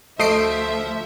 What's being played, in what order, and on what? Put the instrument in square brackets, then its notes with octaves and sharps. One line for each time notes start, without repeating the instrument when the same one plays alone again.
[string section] D2 E5 [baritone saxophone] F3 [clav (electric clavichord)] A3 [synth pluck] D#5 C7 D7